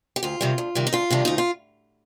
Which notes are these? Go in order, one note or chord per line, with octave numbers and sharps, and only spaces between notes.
G4
D2 F4
C3 D#3 G3
D2
C3 D#3 G3
D#4
D2 F4
C3 D#3 G3 D4
D2 D#4
F4